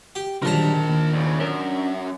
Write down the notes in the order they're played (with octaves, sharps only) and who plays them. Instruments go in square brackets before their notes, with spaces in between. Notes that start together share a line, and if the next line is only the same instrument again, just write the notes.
[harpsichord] G4
[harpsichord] A#1 D#3 A#5 [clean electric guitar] D3 F#3 G3 [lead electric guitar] A#4 A5
[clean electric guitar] D#2
[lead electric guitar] D2 C#3
[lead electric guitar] F#2 [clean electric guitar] C#4 D4 A#4